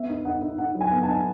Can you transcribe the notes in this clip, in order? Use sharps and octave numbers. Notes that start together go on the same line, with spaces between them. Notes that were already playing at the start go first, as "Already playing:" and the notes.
Already playing: B3 E5
D#4
D#4 F#5
D#4
D#4 F#5
F#3
G#5
B3
A5
D#4